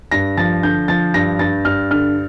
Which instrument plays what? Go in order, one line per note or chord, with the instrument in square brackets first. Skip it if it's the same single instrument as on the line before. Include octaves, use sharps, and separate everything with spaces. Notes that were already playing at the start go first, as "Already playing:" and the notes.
[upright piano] G2 A#6
F3 A6
D3 G6
F3 A6
G2 A#6
G2 A6
G2 F6
D3 F6